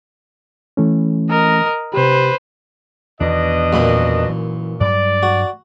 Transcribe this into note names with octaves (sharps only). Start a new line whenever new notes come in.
E3 A3 C#4
A#4 D#5
C3 G4 B4 C5
E2 B2 D#3 D4 D#5
F#2 A#2 B5
E3
G2 F#3 G3 D5
F#4